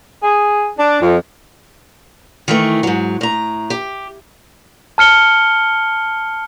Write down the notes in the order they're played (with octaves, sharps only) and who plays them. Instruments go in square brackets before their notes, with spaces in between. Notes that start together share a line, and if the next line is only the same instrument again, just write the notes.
[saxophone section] G#4
D4
F2
[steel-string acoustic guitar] D#3 E3 A3
G#2 F#3
A2 A#5
G4
[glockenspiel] A5 F6 C#7 G7